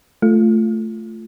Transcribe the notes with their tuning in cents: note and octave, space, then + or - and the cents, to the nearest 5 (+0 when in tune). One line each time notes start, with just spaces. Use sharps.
A3 +0 F4 -10